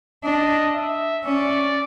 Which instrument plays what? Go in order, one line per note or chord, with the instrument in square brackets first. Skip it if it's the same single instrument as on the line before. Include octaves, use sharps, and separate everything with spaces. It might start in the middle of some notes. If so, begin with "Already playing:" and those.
[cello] D4 [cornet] D#5
[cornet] E5
[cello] C#4 [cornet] D5